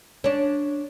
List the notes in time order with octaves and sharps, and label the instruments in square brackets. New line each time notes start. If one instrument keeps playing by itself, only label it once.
[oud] C#4 D4